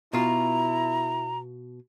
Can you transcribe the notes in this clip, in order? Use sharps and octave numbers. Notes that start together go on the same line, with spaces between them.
B2 E4 F4 A#5